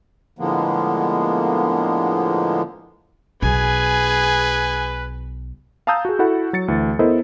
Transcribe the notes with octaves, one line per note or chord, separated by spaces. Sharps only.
A2 D3 F3 G#3 A#3 B3
B1 G#4 B4 G#5
F5 A5 A#5 D#6 E6 G6
F#4 G#4
E4 F#4 A4 F#5 B5
F#3 A6 C#7
D2 E3
B3 E4 A4 A#4 C5 D#5